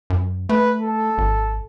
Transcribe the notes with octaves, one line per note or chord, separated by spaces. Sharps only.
F#2
A3 B4
A4
G#1